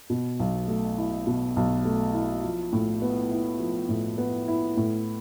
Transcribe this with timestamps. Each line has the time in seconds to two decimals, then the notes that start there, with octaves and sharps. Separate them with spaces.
0.10 B2
0.39 B1
0.68 A3
0.98 E4
1.27 B2
1.56 B1
1.85 A3
2.14 E4
2.44 F3
2.73 A2
3.02 B3
3.31 E4
3.60 F3
3.89 A2
4.18 B3
4.48 E4
4.77 A2